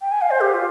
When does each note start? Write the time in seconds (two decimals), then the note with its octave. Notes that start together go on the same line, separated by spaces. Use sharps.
0.01 G5
0.11 G#5
0.21 F5
0.30 C5
0.41 G4
0.54 F4